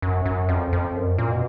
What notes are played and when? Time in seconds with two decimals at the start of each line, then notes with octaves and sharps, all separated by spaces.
0.02 F#2
0.26 F#2
0.49 F2
0.73 F2
0.96 F#2
1.18 A#2
1.31 B2